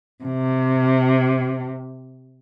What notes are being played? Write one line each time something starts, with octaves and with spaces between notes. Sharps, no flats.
C3